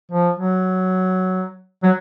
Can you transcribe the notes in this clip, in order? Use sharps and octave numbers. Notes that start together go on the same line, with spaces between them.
F3
F#3
F#3